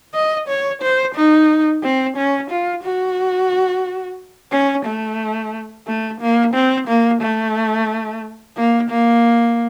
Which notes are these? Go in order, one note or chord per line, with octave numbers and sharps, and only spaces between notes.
D#5
C#5
C5
D#4
C4
C#4
F4
F#4
C#4
A3
A3
A#3
C4
A#3
A3
A#3
A#3